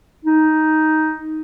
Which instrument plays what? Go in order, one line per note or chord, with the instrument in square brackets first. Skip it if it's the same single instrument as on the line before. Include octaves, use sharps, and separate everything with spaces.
[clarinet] D#4